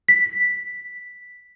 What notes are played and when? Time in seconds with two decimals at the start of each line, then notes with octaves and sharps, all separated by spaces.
0.08 B6